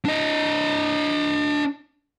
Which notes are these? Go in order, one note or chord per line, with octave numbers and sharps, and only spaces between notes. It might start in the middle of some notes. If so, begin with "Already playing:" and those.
D4 D#5